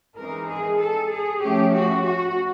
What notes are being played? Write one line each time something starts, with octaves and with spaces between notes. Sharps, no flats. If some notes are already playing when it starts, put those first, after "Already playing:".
E3 G#3 C4 D#4 A#4
G#4
A4
G#4
F3 A3 C#4 G4
F#4
F#4